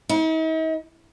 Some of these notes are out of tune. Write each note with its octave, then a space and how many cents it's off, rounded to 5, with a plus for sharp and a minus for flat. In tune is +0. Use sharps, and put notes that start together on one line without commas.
D#4 +45